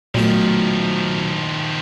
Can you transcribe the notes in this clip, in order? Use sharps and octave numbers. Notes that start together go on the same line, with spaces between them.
B1 A#2 D#3 F3 A3 A#4